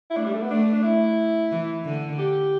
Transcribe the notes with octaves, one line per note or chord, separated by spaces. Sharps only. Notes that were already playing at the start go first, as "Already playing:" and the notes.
E4
A3 D4
G3
A3
B3
A3 D4
D4
E4
E3
D3
G4